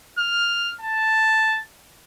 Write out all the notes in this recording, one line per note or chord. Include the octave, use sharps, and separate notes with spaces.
F6
A5